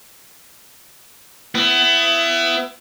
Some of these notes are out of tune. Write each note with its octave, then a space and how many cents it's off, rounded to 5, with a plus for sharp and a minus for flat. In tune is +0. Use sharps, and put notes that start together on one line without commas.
B3 +30 E4 +25